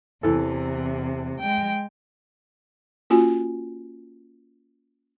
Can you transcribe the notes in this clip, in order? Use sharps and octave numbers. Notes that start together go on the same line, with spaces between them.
E2 C3 E3 A4
G#3 G5
A#3 C#4 F4 F#4 G#5